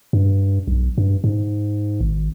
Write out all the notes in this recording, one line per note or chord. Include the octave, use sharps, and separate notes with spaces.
G2
B1
G2
G#2
G#1